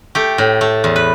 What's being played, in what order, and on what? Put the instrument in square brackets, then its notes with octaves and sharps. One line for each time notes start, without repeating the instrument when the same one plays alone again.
[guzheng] A3 G4
A2
A3
E2
B4